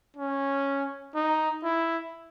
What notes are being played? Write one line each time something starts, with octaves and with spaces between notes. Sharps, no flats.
C#4
D#4
E4